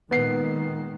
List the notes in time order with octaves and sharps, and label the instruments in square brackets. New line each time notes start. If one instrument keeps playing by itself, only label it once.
[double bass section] A#2 D#3 G#3 [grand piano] B3 C7